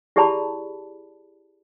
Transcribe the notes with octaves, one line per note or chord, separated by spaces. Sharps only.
E4 G4 G#4 D5 A5 B5